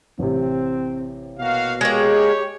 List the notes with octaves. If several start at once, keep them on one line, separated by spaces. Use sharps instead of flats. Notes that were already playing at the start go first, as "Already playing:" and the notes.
A1 C3 C4
B2 A#3 F#4 F5
G#3 A#3 G4 C#5